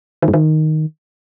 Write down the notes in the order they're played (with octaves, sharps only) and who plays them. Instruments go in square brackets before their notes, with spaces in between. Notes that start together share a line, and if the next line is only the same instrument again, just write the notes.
[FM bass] D#3
G2
D#3